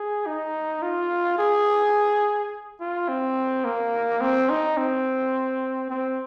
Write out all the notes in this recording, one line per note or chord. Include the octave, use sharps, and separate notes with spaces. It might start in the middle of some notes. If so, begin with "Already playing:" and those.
Already playing: G#4
D#4
F4
G#4
F4
C4
A#3
C4
D#4
C4
C4